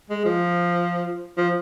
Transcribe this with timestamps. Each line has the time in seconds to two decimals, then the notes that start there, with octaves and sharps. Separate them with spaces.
0.10 G#3
0.25 F3
1.38 F3